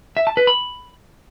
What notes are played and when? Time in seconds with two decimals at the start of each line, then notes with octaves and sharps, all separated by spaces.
0.17 E5
0.27 A5
0.37 B4
0.47 B5